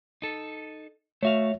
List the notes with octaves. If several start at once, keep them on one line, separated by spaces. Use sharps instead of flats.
D#4 A4
A3 F#4 C#5 E5 F5